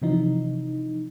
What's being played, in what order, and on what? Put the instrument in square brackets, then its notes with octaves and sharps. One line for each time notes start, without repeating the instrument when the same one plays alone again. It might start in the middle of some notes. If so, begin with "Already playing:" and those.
[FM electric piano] C3 E3 F3 D#4